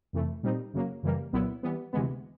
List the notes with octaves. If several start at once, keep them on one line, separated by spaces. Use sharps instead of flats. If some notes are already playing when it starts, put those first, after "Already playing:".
F2 C3 E3 A3
A#2 G3 C4 D#4
F#2 C#3 F#3 A#3
F#2 C#3 E3 G3 A#3
C2 A#2 F#3 B3 E4
E3 G3 B3
D2 C3 E3 G#3 B3